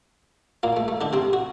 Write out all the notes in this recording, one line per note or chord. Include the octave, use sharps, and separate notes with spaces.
A#2 A#3
A3
A3
D3 D4
C3 C4
F#4